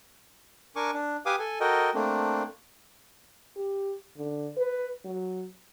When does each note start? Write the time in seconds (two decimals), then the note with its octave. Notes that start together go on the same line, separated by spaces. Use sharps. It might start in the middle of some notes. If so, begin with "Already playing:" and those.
0.76 D4 A#4 G#5 C#6 D6
0.94 D4
1.26 G4 B4 F5 G#5 D6 D#6
1.39 A4 G#5
1.60 F#4 A4 A#4 D#5 G5
1.95 A3 A#3 C4 D4
3.56 G4
4.17 D3
4.57 B4
5.05 F#3